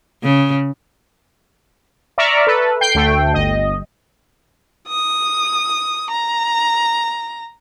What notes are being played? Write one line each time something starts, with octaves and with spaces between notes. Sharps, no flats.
C#3
D5 E5 A#5 C#6 F6
A4 B4
G5 G6 C7
D2 A3 G5
G1 D#5
D#6
A#5